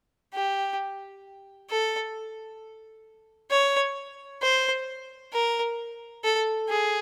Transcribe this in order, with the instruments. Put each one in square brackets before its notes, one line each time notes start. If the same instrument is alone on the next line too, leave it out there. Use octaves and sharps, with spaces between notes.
[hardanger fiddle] G4
A4
C#5
C5
A#4
A4
G#4